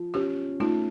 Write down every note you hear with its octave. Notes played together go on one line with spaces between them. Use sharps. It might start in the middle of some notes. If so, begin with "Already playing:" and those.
Already playing: F3
C#4 F4 G4
A3 D#4 F4